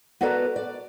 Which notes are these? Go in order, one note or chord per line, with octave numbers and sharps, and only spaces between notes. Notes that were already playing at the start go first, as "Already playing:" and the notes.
B3 F#4 A4 B4 D5 A#5
D5